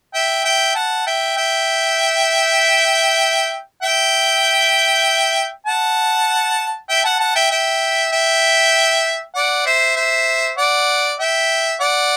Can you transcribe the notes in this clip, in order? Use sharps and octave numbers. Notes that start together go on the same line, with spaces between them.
E5 G5
E5 G5
F#5 A5
E5 G5
E5 G5
E5 G5
F#5 A5
E5 G5
F#5 A5
F#5 A5
E5 G5
E5 G5
E5 G5
D5 F#5
C5 E5
C5 E5
D5 F#5
E5 G5
D5 F#5